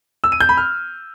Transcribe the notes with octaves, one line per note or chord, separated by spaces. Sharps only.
E6
D#7
G6
B5
F6